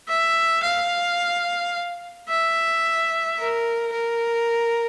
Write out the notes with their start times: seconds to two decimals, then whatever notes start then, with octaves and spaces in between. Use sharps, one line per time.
0.08 E5
0.63 F5
2.29 E5
3.39 A#4
3.93 A#4